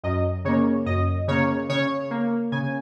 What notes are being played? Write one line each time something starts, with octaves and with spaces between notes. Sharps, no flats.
F#2 D#5
C#3 A#3 C#5
F#2 D#5
C#3 A#3 C#5
C#3 C#5
A#3
C#3 G#5